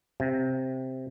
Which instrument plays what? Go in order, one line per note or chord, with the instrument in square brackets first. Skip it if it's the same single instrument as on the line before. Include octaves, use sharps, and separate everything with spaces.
[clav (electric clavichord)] C3